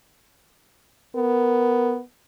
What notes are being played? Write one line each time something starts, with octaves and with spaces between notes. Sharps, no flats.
B3 A#4